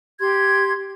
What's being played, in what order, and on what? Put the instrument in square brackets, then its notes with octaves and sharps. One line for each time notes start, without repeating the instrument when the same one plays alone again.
[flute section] G4 C6 G#6